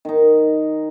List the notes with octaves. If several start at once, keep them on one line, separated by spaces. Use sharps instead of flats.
D#3 D#4